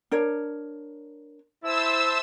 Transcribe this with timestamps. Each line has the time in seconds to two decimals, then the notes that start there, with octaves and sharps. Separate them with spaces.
0.12 D4 A#4 C#5
1.64 E4 C5 E5 A5 E6